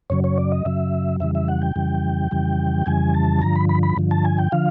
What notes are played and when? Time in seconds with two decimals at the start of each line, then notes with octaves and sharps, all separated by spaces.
0.10 F#2 C#3 F#3 C#5
0.24 C#5
0.38 D5
0.52 D#5
0.65 F#2 C#3 F#3 E5
1.20 F2 C#3 E3 G3 E5
1.35 E5
1.48 F#5
1.62 G5
1.76 F2 C#3 E3 G3
2.31 F2 C#3 E3 G3
2.86 F2 C#3 E3 G3 G#5
3.14 A5
3.41 G2 D3 F3 A#5
3.56 B5
3.69 B5
3.83 B5
3.97 G2 D3 F3
4.11 A5
4.25 G#5
4.38 G5
4.52 D3 F3 F5